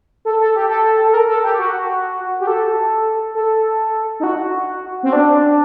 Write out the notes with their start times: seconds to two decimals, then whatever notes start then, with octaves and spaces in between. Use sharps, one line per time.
0.25 A4
0.40 A4
0.55 G4
0.69 A4
1.09 A4
1.14 A#4
1.28 A4
1.44 G4
1.58 F#4
2.40 G4
2.47 A4
3.35 A4
4.20 D#4
4.24 F#4
5.03 C4
5.13 D4